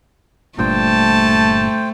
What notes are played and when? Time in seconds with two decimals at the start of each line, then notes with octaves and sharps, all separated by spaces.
0.59 G1 G2 A#2 A3 C5 G5 A5